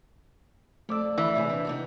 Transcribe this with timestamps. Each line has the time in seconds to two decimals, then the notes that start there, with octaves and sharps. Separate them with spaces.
0.89 F2 A3 A4 D5 D6 E6
1.18 E3 E5
1.35 A2 C3 G#4
1.49 E2 C3 D4 B4
1.65 C3 D#4 F#4